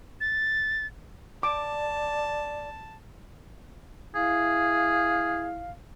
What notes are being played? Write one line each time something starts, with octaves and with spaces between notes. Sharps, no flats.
A6
D5 A5 D6
E4 G#4 F5